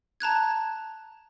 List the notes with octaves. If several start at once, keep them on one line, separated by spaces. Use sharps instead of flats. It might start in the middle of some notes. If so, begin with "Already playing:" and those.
A5 A#5 F#6 G#6